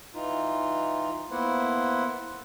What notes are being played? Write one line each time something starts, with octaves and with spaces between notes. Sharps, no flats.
E3 D#4 F4
A#3 B3 E4 C5 F#5